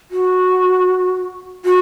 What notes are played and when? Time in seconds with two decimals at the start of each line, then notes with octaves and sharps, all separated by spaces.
0.11 F#4
1.65 F#4